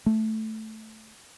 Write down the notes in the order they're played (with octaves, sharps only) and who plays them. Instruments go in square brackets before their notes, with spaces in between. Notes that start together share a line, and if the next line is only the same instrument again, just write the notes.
[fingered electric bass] A3